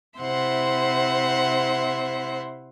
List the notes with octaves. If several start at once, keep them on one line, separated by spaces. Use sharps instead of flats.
C3 E4 C5 E5 F#5 C6